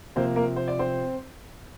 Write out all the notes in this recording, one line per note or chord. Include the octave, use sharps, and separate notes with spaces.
C3 F3 A#3 C4 C5
A#3 A#4
C5
D5
C4 C5